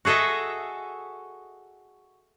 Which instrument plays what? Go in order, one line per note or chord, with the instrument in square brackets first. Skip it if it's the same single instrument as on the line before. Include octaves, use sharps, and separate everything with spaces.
[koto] F#4 G#4 A4 D#5 E5